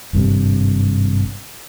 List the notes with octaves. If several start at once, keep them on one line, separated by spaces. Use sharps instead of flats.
G#1 G2 C3